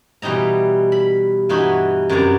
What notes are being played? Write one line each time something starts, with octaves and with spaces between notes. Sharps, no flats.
B2 E3 G3 D#4 A#5
B5
G2 E3 D#4 F#4 C#5 B5
F#2 C3 B3 C#5 D5 A#5